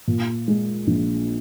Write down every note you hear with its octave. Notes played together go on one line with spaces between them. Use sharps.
A#2
G#3
A#1